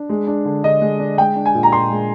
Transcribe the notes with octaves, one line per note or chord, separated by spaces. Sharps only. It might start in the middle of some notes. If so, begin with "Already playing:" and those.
Already playing: D4
G#3
D4
D3
D3 D#5
G#3
D4
G#3 G5
D4
G#5
A#2
A#5
A#2 C6
G#3